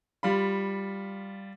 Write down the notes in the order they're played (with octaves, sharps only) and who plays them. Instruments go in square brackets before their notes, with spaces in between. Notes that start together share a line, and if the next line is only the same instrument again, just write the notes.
[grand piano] G3 F4 B5